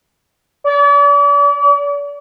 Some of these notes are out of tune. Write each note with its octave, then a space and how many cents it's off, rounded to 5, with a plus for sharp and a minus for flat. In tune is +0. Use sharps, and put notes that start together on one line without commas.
D5 -40